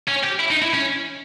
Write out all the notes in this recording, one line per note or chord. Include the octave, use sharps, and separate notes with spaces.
C#4
G4
E4
D#4
E4
C#4